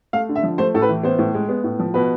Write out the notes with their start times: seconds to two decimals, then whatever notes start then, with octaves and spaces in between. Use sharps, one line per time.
0.13 A3 F5
0.29 D3
0.36 E5
0.44 F3
0.58 A3 C5
0.74 A2 A4
0.82 B4
0.89 E3
1.03 B3 C5
1.19 A2
1.34 G#3
1.49 B3
1.64 A2
1.79 F3
1.94 B2 B4